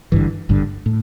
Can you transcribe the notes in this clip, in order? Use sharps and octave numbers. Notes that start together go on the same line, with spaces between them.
G#1 G2 D3 E3
G#1 G2 D3
A2